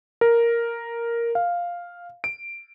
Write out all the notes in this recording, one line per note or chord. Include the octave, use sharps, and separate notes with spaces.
A#4
F5
D7